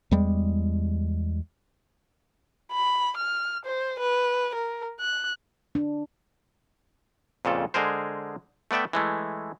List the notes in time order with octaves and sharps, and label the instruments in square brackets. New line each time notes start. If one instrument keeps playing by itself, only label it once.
[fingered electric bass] E2 G3 G#3
[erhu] B5
F6
C5
B4
A#4
F#6
[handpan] D4
[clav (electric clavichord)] F2 A#2 C#3 A4
D3 G#3 G#4 A#4 C5
A3 B3 D5 E5 G5
E3 G#3 A3